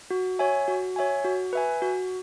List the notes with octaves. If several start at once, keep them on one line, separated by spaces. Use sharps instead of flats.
F#4
C#5 E5 G#5
F#4
C#5 E5 G#5
F#4
B4 E5 G#5
F#4